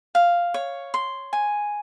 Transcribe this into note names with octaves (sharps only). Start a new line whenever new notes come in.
F5
C#5
C6
G#5